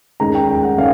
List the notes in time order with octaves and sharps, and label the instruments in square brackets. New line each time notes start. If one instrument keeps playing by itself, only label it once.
[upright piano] D#2 D#3 G#3 C#4 A#5
G5
G5
F#5
D#3 C#4 F5